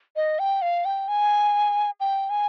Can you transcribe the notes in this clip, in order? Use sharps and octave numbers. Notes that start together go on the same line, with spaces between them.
D#5
G5
F5
G5
G#5
G5
G#5